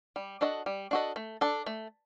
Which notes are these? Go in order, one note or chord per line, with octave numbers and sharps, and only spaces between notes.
G3
D4 F#4 A4 D#5
G3
D4 F#4 A4 D#5
A3
D4 A4
A3